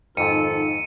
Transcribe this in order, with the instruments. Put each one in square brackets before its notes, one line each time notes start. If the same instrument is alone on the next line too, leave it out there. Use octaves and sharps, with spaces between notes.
[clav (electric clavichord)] F2 G#2 [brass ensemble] D#3 F3 A4 [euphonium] D#4 [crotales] C#7 D#7